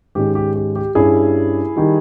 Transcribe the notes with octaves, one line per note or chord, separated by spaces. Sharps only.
G#2 D#3 G#3 C#4 G4
G4
G4
G4
G2 G3 C#4 E4 G#4
D#3 G3